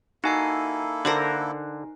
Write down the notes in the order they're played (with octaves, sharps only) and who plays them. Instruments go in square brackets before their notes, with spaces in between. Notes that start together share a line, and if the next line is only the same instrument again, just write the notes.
[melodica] A#3 E4 A4 [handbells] D#4 G#5 C7 [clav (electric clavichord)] F#4
[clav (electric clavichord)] D3 [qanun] A#4 C5 F#5